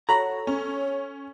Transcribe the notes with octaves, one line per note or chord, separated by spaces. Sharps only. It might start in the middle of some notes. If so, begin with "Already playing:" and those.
F#4 A4 C#5 A#5 B5
C#4